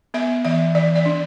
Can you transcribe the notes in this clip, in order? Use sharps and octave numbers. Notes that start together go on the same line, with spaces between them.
B3 E5
E3 E5
E3 D5
D5
D4